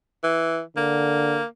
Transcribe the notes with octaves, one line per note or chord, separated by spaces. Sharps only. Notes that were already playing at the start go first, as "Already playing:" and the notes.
E3
D3 A#3